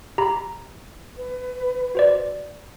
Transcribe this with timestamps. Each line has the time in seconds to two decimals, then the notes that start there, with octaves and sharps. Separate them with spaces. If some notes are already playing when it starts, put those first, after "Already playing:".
0.18 G4 A#5 B5
1.17 B4
1.95 F#4 C5 D5